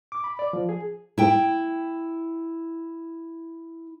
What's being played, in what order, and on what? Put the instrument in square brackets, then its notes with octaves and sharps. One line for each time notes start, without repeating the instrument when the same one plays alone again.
[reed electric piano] D6
B5
D5
F3
G#4
[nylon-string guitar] E4 G5